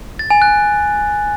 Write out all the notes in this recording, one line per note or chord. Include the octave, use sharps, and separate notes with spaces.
A6
G#5
F#6